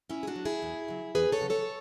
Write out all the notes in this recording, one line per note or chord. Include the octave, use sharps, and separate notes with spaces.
A2 C#4 E4
G#4
D4 F#4
F#3
E4 G#4
E2
C#3 F#3
E2 G#4 B4
A4 C#5
C#3 F#3
A4 C#5